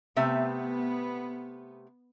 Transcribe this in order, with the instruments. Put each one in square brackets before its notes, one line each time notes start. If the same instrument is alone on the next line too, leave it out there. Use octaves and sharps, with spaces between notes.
[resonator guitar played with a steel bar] C3 A3 E5 [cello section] B3